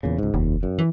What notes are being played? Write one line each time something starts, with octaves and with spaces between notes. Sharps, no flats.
E2 A#2 C#3
C#2 G#2
F1 D#2
F#2
E3